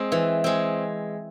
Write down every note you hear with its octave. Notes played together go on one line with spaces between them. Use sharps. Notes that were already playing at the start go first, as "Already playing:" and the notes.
Already playing: G#3 C4
E3
G#3 C4